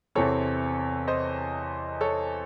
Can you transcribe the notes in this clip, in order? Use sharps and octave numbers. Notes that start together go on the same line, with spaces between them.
E2 C3 E3 C4 A4 C#5
C5 D#5
A4 C#5